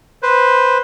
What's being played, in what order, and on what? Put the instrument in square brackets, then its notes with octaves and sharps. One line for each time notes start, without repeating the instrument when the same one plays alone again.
[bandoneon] B4 C5